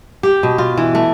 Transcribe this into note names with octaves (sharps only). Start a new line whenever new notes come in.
G4
B2
F4
E3
A3